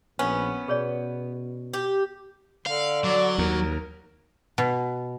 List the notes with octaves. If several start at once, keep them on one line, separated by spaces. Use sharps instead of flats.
A#1 B3 C#4
B2 G#4 C#5 D5
G4
D3 F5
F#3 D5
D#2 A#4
B2